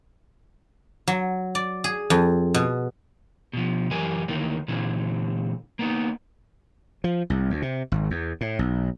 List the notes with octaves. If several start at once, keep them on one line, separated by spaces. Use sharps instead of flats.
F#3
D5
G#4
F2
B2
B2 F3
F#2 E3 G3 A#4 G#5
D2 D#3 E3 A#3
A#2 D3 E3 C4
A#3 B3 D#4
F3
C2
D2
C3
G#1
E2
A2
B1